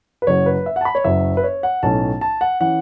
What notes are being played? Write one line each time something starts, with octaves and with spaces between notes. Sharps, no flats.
B4
F#1 F#2 C#3 F#3 C#5
B4
E5
F#5 A5
B5
C#5
F#1 F#2 F#3 E5
B4
C#5
F#5
B1 A2 A3 C#4 A5
A5
F#5
E3 C#4 F#5